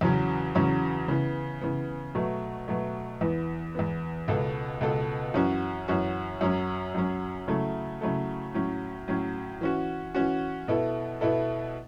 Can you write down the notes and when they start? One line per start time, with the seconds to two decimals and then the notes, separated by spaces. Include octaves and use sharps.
0.01 E2 C#3 F#3 C#4
0.55 E2 C#3 F#3 C#4
1.08 C#3 E3 B3
1.61 C#3 E3 B3
2.15 B2 F#3 A3
2.68 B2 F#3 A3
3.21 E2 E3 B3
3.75 E2 E3 B3
4.28 C#2 B2 B3 A4
4.81 C#2 B2 B3 A4
5.34 F#2 E3 C#4 F#4
5.88 F#2 E3 C#4 F#4
6.41 F#2 F#3 C#4
6.94 F#2 F#3 C#4
7.48 C#3 F#3 A3 E4 A4
8.01 C#3 F#3 A3 E4 A4
8.54 A2 F#3 C#4
9.08 A2 F#3 C#4
9.61 E3 C#4 F#4
10.14 E3 C#4 F#4
10.68 B2 B3 E4 A4
11.21 B2 B3 E4 A4